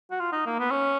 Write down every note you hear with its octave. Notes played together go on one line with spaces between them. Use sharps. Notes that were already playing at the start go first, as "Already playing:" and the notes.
F#4
F4
D#4
A#3
B3
C#4